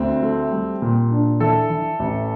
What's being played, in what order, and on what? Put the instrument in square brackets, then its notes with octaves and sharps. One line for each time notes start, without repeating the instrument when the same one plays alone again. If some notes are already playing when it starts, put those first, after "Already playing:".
Already playing: [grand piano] D2 [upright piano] C4
[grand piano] A3
G3
A#2
D4
[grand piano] E3 [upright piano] A4
[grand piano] E3
A1